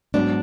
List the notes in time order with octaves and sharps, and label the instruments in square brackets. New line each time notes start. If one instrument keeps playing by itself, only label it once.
[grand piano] G#2 F#3 B3 [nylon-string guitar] D4